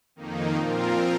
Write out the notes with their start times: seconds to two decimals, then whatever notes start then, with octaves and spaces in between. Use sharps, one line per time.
0.16 F2 D#3 A#3 D#4
0.56 A#2 F3 C4 F4 A#4